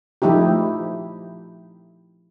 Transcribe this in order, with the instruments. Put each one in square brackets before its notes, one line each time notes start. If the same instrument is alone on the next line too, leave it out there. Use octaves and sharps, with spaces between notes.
[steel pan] F3 A3 D#4 E4 G4